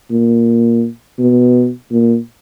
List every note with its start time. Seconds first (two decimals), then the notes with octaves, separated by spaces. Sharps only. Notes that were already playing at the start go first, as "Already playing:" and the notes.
0.11 A#2
1.19 B2
1.91 A#2